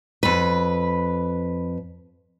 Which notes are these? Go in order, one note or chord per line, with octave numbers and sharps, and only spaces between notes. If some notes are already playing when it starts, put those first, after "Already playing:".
F2 B4